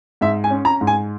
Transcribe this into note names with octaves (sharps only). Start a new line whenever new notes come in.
G#2 E5
G#5
C#4
A#5
G#2
G#5